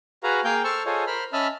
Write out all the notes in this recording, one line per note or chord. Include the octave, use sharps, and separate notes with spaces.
F#4 G#4 B4 F5 A#5
A#3 G#4 A#4 F5 G5 G6
A4 C5 A5 C#6 E6 F6
F4 G#4 A4 C5 C#5 D#5
A#4 C5 B5 F6
C#4 D#5 E5 A5 B5 F6